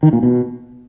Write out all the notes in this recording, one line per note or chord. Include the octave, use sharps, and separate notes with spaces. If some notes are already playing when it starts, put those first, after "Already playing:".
D#3
A#2
B2